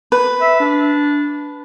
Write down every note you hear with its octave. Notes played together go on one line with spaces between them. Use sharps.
B4
E5
D4